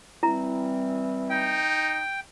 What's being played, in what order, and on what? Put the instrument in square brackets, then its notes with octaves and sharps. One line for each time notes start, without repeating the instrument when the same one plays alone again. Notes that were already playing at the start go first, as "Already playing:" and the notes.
[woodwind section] E3 G3 C4 [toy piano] E4 A#5
[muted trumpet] D#4 [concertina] G5